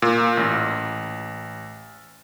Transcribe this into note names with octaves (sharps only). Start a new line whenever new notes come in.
A#2
A1